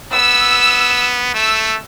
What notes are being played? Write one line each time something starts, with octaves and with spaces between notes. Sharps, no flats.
B3 E6
A3 E6